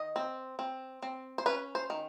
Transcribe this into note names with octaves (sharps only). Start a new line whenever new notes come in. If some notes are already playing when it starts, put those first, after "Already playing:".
Already playing: D#3 D#5
C4
C4
C4
C5
C#4 B4
C5
D#3